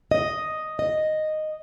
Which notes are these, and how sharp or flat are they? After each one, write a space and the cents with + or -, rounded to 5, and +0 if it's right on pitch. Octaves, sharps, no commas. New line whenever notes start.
D#5 +0
D#5 -5